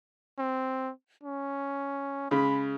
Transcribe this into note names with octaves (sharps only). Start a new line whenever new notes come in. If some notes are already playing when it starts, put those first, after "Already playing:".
C4
C#4
C#3 G#3 B5